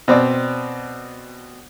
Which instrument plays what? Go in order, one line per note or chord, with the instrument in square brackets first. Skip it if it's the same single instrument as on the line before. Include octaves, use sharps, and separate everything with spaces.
[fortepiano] B2 C4 D5